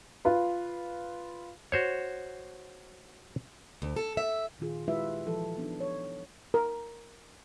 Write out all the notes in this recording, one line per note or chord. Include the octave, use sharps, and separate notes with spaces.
F4 B4
F#4 C5 C#5
D2
A4
E5
A#2 D#3 F4 G#4
G#3 E4 F4 G4 B4 E5
E3 F3 A4
B3 D4 D#4
C#5
A#4